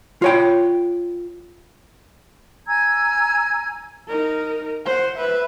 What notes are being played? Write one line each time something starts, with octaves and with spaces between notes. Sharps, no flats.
F4 C#5 G5
G#5 A#5 E6 G#6
D#4 A#4
C5 F#5
B4 E5